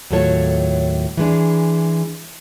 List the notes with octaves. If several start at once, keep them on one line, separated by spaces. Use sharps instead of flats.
D#2 A2 F#3 F4 A4 C#5
E3 G#3 D4